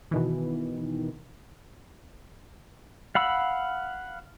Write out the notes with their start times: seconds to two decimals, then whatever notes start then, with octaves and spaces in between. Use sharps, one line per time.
0.11 B2 D#3 E3
3.15 F5 F#5 B5 E6